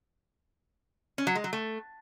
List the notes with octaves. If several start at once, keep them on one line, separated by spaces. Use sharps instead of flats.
C#4
F#3
G#3
F#3
A3